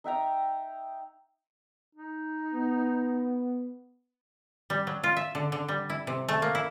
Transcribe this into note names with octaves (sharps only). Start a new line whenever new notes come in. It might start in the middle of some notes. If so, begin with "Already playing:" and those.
D#4 E5 G5 A#5
D#4
B3
G3
F#3
F4
E5
D3
D3
G3
E4
C3
A3
A#3
E4